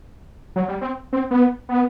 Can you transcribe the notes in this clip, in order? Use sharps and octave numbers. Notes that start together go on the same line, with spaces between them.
F#3
G3
C4
C4
B3
B3